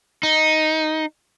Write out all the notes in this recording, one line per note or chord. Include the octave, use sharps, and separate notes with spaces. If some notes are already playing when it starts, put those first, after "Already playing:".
D#4